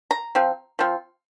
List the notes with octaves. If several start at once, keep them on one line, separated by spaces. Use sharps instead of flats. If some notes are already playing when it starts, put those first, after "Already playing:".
A#5
F3 C4 F4
F3 C4 F4